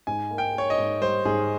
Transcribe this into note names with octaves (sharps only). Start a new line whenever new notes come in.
G#2 G#5
A#3
G5
A#3 C#5
D#5
G#2
G3 C5
G#2 G#4